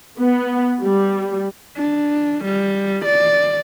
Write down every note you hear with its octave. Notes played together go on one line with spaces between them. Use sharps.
B3
G3
D4
G3
D5